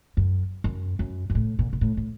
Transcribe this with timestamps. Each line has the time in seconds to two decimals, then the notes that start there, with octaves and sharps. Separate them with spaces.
0.17 F#2
0.64 F#2
0.99 F#2
1.30 F#2
1.35 A2
1.59 A#2
1.73 A#2
1.81 A2
1.97 A2